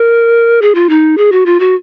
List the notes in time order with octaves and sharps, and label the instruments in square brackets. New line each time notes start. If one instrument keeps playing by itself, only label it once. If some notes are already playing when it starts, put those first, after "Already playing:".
Already playing: [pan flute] A#4
G#4
F4
D#4
G#4
F#4
F4
F#4